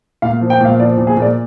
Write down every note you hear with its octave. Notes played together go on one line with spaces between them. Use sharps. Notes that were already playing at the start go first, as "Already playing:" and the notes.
A#2 F5
F3
G5
A#2 F5
F3 D5
A#2
G#4
A#2 D5